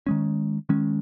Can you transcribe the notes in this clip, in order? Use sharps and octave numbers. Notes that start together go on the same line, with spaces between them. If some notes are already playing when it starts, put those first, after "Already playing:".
D#3 G#3 C#4
D#3 G#3 C#4